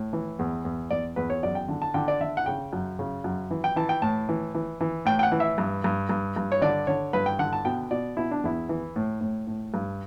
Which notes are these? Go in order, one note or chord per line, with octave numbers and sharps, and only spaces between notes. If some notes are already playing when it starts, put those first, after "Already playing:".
Already playing: A2
E3
E2
E2
E2 D5
E2 B4
C#5
F#2 D5
G5
D3
A5
D3 G5
D5
D3 E5
F#5
C#3 G5
F#2
C#3
F#2
E3
G5
E3 A5
G5
A2 A5
E3
E3
E3
A2 G5
G5
F#5
E3
E5
G2
G2
G2
G2
C#5
D3 D5
D3 C#5
G2 B4
G5
D3 F#5
A5
B2 G5
B2 D5
B2 E4
D4
E2 E4
E3
A2
A2
A2
G2